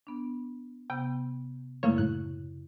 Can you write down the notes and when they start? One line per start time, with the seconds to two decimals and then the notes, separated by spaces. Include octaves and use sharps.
0.07 B3 D4
0.90 C3 B3 G5
1.83 F#2 C#3 A3 A#3 E4 C#5
1.98 A2 F#6